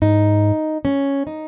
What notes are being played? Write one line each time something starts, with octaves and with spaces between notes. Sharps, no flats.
G#2 D#4
C#4
D#4